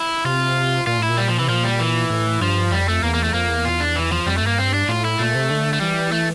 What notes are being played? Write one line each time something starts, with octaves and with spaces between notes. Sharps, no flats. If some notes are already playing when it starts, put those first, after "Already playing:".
Already playing: E4
C3 F4
A#2 F4
A2
E4
A#2
G3
F3
C3 E3
A#2 F3
G3
E3
A2
G2 F3
F2 G3
A3
E2 A#3
A#3
A3
F2 A#3
E2
F4
D4
E3
F3
F2 G3
A3
G2 A#3
C4
D4
A2 F4
E4
A#2 A3
C3
D3
A3
E3 G3
A3